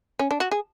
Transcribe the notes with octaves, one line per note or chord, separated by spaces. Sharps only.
C#4
D4
F#4
G#4